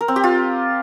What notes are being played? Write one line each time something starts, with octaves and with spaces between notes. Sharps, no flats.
A#4
C4
G4
F4